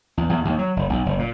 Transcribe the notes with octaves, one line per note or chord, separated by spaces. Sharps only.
E2
E2
D#2
F#3
F#1
B1
F#1
A#2